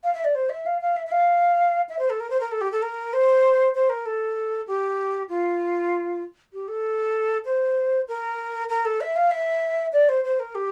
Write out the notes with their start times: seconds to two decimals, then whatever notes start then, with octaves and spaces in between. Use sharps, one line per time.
0.03 F5
0.14 E5
0.24 D5
0.35 C5
0.49 E5
0.66 F5
0.81 F5
0.96 E5
1.07 E5
1.12 F5
1.89 E5
1.99 C5
2.10 A4
2.20 A#4
2.30 C5
2.40 A#4
2.51 A4
2.61 G4
2.72 A4
2.82 A#4
3.13 C5
3.75 C5
3.89 A#4
4.06 A4
4.67 G4
5.29 F4
6.53 G4
6.68 A4
7.45 C5
8.08 A#4
8.69 A#4
8.85 A4
9.01 E5
9.16 F5
9.31 E5
9.93 D5
10.09 C5
10.24 C5
10.39 A#4
10.55 G4